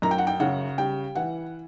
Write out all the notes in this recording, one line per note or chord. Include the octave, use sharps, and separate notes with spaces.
F#2 A#5
G5
F#5
G5
C#3 F#5
G3 G5
E3 F#5